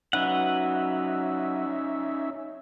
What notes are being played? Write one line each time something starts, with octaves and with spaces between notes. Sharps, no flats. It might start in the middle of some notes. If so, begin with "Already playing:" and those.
F#3 C#4 D#4 B4 E5 F#5